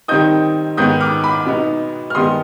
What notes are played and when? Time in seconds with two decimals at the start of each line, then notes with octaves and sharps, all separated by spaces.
0.08 D#3 G3 C4 D#4 D#6 G6
0.77 G#2 D#3 B3 D#6 G6
1.01 D6 F6
1.24 B5 D6
1.46 B2 B3 D#4
2.10 F6
2.15 G2 D#3 G#3 B3 D#4 C6 D#6